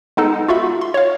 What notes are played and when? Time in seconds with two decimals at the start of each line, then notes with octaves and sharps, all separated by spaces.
0.17 G#3 B3 D#4 A4
0.48 F4 F#4 E5 B5
0.81 C6
0.94 C#5 F5